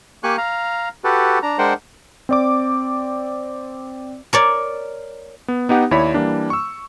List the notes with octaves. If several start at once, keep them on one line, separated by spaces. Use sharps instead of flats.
A#3 G4 G#5 C#6 F#6
F5 A#5
F#4 G4 A4 B4
D4 A#5
G#3 D4 A#4 C5 F#5 G5
C4 D5 D6
A#4 C#5 D5
B3
B3 D#4 G4 F#5
D#2 E4 C#5 D5 B5
E3 G3 A#3 D4
C#6 E6